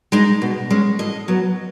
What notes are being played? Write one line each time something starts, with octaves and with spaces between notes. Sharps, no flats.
G#3 D#4
B2
G#3 C#4
A2 D#5
F#3 B3